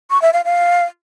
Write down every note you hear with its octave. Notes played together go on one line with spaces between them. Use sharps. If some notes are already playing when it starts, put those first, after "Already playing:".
C#6
E5
F5
F5